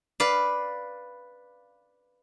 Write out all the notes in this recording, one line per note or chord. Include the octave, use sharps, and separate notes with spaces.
B4 D5 F5